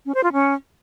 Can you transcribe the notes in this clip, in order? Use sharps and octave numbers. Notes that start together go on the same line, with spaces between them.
C#4
C5
F4
C#4